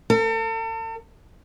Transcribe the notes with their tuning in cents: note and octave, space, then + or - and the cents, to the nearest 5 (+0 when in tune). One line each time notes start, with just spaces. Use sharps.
A4 +40